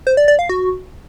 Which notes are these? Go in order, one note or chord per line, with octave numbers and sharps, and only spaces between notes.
C5
D5
D5
F5
F#4